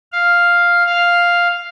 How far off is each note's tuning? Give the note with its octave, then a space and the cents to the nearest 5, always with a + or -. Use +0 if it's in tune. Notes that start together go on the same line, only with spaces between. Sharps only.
F5 +0
F5 +0